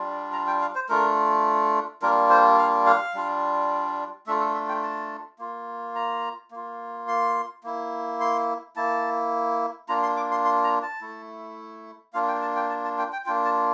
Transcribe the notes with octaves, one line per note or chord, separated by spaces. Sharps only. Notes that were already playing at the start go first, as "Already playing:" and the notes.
Already playing: G3 D4 F4
A#5
G5
F5
C5
A3 D4 F4 A#4
G3 A#3 D4 F4 A#4
C5
F5
F5
G3 D4 F4
A3 D4 F4 E5
A4
E5
G5
A5
A#3 F4
A#5
A#3 F4
C6
A#3 E4
C6
A#3 E4 A5
A#3 D4 F4 A#5
C6
D6
C6
C6
A#5
A5
A3 E4
A#3 D4 F4 F5
G5
A5
G5
A5
A5
G5
G5
A#3 D4 F4 G5
A5